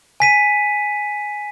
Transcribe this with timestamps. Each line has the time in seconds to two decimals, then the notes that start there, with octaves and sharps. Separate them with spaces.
0.20 G#5 B6 D#7